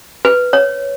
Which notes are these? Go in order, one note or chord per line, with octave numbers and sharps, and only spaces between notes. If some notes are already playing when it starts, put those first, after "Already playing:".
B4
C#5